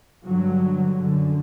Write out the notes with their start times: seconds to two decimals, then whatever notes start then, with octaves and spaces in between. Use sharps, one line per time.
0.24 G2 D3 F#3
0.96 F#2 D3